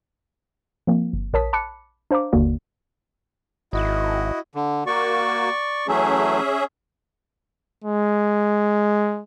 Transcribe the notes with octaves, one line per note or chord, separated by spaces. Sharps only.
F3 A#3 C4
G1
A#1 A#4 C#5 A5 D#6 B6
A5 B5 D6 F#6 C#7
D4 C5 F5 A#5 D6
G1 D#2 D3 A#3 F#4 D5
G#1 E4 F#4 D#5
D3
A#3 F#4 D5 C#6
E3 F#3 A3 C#4 G#4 E5
G#3